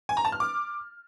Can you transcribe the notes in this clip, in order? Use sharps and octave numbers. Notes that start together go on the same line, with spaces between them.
G#5
A#5
A5
F6
D6